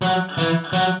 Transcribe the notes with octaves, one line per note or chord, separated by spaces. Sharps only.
F#3
E3
F#3